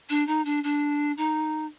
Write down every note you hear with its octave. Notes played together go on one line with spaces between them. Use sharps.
D4
D#4
D4
D4
D#4